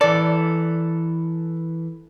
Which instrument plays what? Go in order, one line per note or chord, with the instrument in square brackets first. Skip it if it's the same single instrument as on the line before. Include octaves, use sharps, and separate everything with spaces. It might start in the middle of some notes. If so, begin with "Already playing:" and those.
[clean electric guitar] E3 A4 [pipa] D5